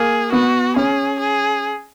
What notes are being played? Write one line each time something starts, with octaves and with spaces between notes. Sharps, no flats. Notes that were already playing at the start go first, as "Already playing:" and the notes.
Already playing: A#3 G#4
B3 F#4
C#4 G#4
G#4